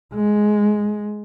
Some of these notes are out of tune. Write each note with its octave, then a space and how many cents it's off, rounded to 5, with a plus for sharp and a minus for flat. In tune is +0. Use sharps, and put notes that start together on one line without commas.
G#3 +5